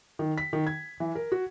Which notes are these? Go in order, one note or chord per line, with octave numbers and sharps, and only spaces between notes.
D#3
B6
D#3
G#6
E3
A#4
F#4